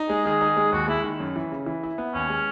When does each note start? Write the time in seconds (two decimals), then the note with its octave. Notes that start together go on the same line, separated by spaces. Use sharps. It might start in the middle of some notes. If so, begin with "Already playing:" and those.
Already playing: D#4
0.09 G#3 G#4
0.25 D#3 G#4
0.41 D#4
0.57 G#3
0.72 D#2 F#4
0.88 G#3 E4
1.04 D#3
1.20 F#2
1.36 E3
1.52 C#3
1.66 E3
1.83 E4
1.98 B3
2.14 D#2 C#4
2.30 G#3